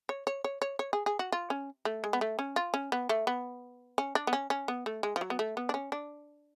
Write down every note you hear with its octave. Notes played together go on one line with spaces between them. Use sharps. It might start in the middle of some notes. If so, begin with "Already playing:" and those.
C#5
C#5
C#5
C#5
C#5
G#4
G#4
F#4
F4
C#4
A3
G#3
B3
A3
C#4
F4
C#4
B3
A3
B3
C#4
D4
B3
C#4
C#4
B3
A3
G#3
F3
F#3
B3
A3
B3
D4
C#4
D4